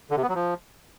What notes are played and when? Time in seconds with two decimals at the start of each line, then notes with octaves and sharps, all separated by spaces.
0.10 D3
0.17 C3
0.23 B3
0.29 F#3
0.35 F3